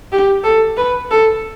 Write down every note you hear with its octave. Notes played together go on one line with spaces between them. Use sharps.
G4
A4
B4
A4